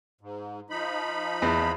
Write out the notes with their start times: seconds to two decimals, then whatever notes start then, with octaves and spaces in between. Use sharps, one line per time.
0.21 G#2
0.70 F3 D#4 B5
1.42 E2